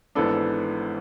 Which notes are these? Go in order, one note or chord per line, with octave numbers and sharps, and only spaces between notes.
G#1 G#2 E3 B3 D4 A4